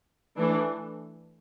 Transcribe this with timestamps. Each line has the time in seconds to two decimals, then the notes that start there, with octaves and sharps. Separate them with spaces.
0.37 E3 A3 D4